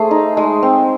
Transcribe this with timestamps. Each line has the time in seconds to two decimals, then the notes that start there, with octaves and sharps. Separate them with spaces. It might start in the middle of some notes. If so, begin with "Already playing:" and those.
Already playing: A3 G#4 C5
0.11 D#4
0.37 G#3
0.63 C4